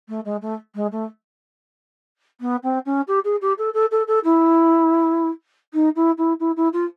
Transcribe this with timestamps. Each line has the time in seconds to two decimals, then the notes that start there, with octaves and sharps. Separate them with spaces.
0.09 A3
0.25 G#3
0.42 A3
0.75 G#3
0.92 A3
2.41 B3
2.63 C4
2.86 C#4
3.08 G4
3.24 G#4
3.41 G4
3.58 A4
3.74 A4
3.91 A4
4.07 A4
4.24 E4
5.74 D#4
5.96 E4
6.18 E4
6.40 E4
6.57 E4
6.73 F4